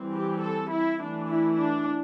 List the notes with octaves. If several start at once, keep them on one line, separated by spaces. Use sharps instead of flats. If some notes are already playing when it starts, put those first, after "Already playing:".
Already playing: E3 G3 C4
G4
A4
E4
E3 A3 D4
E4
D4